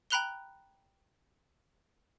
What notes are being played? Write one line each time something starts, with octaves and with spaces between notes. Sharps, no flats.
G5 A#5 B5 F#6 F7 G7